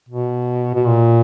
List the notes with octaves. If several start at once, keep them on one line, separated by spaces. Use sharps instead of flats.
B2
B2
A#2